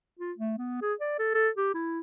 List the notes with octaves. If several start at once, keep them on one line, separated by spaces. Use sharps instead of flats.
F4
A3
B3
G#4
D5
A4
A4
G4
E4